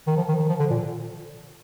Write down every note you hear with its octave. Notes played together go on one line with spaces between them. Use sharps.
D#3
F3
D#3
D#3
F3
D3
A#2